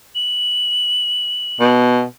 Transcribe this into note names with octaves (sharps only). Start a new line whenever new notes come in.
F#7
B2